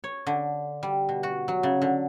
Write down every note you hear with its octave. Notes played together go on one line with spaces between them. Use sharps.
C#5
D3
G3
B2
F#4
F#3
C#3
D3